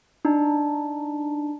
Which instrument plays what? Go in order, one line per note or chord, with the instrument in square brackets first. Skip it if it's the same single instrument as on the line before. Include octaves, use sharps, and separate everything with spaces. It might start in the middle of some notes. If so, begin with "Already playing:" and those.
[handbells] D4 D#4